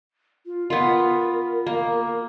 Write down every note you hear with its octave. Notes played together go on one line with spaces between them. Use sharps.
F4
B3 F4 A#4
A#3